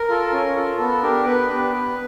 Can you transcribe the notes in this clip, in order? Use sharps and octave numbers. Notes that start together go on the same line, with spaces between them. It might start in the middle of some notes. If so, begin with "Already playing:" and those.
Already playing: A#4
F4 A4
C#4
F4 A4
B3 A4
D4 G4 A#4
B3 B4
D4 G4
B3